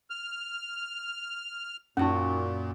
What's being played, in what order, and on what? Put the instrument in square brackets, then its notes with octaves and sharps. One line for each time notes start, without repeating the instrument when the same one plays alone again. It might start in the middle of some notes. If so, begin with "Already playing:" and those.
[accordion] F6
[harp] F#2 F#4 C#6 [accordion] A#2 [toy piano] C#4 D#4